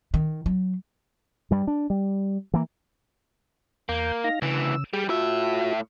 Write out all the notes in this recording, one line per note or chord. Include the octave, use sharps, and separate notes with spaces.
D#3
F#3
G2 G3
D4
G3
E3 A#3
E2 A#3 G6
D#4 F5 A#6
D2 C#3 E3 E6
G3 G#4
A2 F4 F#4 E5